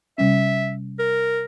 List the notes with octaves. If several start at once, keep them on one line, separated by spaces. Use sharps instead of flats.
C3 G3 C#4 E5
A#4